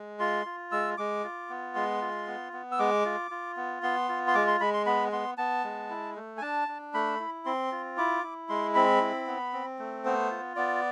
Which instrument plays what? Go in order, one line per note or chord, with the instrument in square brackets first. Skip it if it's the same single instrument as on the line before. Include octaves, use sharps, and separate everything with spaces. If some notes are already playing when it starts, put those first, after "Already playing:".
Already playing: [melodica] G#3
F4 C6
F4
G#3 E6
G#3 D6
F4
B3
G#3 C6
F4
B3
B3
E6
G#3 D6
F4
F4
B3
B3 C6
F4
C6
G#3 D6
C6
G#3 B5
C6
B3 B5
B3 C6
B3 A5
G#3
E4
A3
G#5
D4 A5
D4
A3 B5
E4
C4 C6
F4
E4 D6
E4
G#3 C6
C4 B5
E4
B3
C4
A3
B3 C5
F4
B3 D5